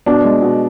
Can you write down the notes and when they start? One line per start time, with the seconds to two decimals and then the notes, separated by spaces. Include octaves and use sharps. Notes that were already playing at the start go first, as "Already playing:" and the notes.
0.06 B2 D4
0.24 G#3
0.42 B2